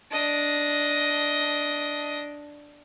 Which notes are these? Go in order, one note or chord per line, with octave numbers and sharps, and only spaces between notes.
D4 D#5